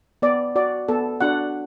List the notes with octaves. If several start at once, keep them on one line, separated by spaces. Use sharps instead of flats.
B3 D5
F#4 D5
B3 A4
D4 F#4 F#5